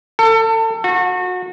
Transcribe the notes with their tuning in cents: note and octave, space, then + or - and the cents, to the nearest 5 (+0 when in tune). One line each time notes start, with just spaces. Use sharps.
A4 +30
F#4 -30